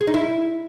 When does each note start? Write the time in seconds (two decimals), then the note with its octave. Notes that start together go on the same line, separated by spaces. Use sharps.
0.01 G#4
0.07 D#4
0.14 E4